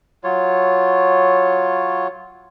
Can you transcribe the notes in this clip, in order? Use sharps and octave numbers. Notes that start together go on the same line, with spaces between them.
F#3 F4 C#5